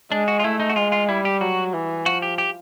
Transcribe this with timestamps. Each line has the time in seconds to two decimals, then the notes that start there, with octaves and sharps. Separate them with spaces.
0.12 G#3 D4
0.28 F#4
0.39 F4
0.44 A3 E4
0.60 D#4
0.69 F#4
0.76 G#3 F4
0.92 F4
1.09 G3 E4
1.25 G4
1.41 F#3 F#4
1.73 E3
2.06 F3 F#4
2.22 G4
2.38 G4